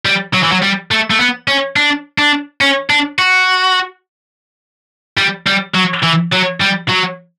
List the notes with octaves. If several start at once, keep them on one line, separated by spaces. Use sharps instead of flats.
G3
F#3
E3
F#3
G3
A3
A3
B3
C#4
D4
D4
C#4
D4
F#4
G3
G3
F#3
E3
F#3
G3
F#3